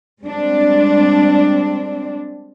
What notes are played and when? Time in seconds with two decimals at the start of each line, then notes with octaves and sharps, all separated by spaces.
0.22 G3 G#3 C4 D4